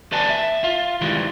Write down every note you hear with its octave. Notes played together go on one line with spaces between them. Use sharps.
D#2 B4 D5 G#5 A5
E5
F4
D#3 E3 G3 G#3